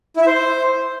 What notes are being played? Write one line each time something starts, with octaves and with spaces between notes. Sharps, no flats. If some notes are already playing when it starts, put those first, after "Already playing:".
E4
E5
C5